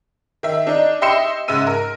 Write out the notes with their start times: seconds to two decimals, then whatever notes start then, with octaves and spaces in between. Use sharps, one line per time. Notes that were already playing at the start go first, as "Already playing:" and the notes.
0.43 D#3 E5
0.67 D4 D#4
1.01 G4 D#5 E5 C6 C#7 E7
1.48 G#2 C#3 E5 E6 D#7
1.67 A#4